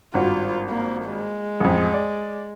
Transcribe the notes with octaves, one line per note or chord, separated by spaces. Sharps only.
G#1 G2 F4 F#4
A#3
G#3
A1 F2
D5